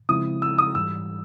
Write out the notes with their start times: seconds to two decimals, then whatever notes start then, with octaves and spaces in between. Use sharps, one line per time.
0.09 C#3 F3 G#3 C4 E4 D#6
0.42 E6
0.58 D#6
0.75 G#2 E3 G3 E6